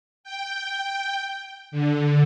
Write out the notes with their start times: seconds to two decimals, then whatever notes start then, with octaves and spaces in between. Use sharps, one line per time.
0.24 G5
1.71 D3